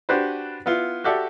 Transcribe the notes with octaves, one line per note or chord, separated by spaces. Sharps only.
D4 F#4 G4 B4 C5
B3 E4 F4
F#4 G4 A4 D5 E5